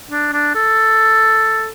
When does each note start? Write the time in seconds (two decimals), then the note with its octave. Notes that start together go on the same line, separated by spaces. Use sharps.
0.11 D4
0.33 D4
0.55 A4